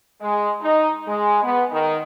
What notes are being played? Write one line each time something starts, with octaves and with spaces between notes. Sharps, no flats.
G#3
D#4
G#3
B3
D#3